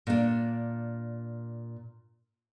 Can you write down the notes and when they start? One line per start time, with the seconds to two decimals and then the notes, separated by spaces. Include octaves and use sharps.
0.07 A#2 D4